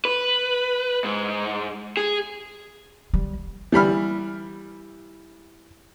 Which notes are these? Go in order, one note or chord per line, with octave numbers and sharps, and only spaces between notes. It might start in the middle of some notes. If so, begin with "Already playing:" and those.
B4
G#2
G#4
G3
E3 G3 B5 F6